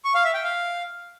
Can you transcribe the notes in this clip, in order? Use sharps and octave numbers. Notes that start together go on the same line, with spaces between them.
C#6
F5
E5
G5
F5